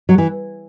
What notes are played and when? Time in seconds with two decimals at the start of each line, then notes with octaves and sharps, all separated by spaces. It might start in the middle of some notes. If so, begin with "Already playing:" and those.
0.09 F#3
0.18 E3